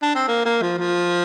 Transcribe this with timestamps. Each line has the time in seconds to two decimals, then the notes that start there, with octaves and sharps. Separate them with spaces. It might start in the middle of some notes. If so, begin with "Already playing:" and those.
0.02 D4
0.15 C4
0.28 A#3
0.45 A#3
0.62 F3
0.79 F3